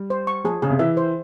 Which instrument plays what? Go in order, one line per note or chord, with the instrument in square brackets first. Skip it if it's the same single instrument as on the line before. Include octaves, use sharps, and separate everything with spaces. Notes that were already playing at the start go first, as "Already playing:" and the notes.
Already playing: [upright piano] G3
[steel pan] C5
C#6
[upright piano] F3 [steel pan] G#4
[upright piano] C#3 [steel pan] G#4
[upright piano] C3
[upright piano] E3 [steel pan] E5
[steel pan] C5